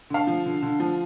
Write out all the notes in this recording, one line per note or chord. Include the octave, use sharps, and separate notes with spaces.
D3 F5 A5
F3
D3
D3
F3